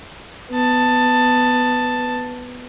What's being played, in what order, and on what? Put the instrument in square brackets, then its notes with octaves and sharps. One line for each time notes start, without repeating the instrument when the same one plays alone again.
[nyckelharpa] B3 A5